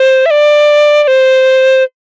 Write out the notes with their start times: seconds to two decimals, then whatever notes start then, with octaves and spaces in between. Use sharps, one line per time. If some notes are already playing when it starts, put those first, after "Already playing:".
Already playing: C5
0.26 E5
0.31 D5
1.03 D5
1.08 C5